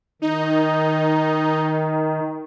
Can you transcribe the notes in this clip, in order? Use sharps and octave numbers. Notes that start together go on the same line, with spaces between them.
D#3 D#4